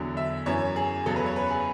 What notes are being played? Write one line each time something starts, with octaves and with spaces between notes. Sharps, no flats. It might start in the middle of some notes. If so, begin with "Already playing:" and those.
Already playing: E2 D3 F#3
E5
F#2 E3 C#5
G#4
E2 C#3 F#3 A4
B4
C#5
B4
G#4